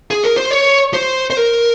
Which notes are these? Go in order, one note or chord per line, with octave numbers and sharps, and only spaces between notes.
G#4
A#4
C5
C#5
C5
C5
A#4